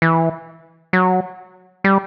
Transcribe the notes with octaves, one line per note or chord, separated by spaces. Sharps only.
E3
F#3
G3